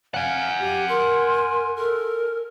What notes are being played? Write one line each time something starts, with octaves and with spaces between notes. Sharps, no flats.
F5 F#5 G#5
G4
A#4 C6
A4 A#4